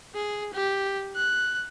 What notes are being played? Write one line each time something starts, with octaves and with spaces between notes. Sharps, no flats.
G#4
G4
F#6